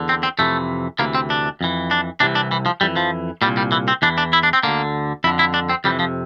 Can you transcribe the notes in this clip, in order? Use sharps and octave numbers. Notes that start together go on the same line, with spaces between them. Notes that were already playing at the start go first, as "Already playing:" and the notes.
Already playing: E2 D3
C4
C4
F2 C3 E3 A3
D2 C3 E3 A#3
C4
D4
F2 E3
D4
C2 C3 E3 D4
D4
E3
F3
F2 E3 G3
F3
C2 A#2 G3
G3
E3
C4
E2 E3 D4
D4
E4
D4
C4
D2 D3 A#3
F2 D3 E4
E4
D4
C4
F2 C3 E3 G3
F3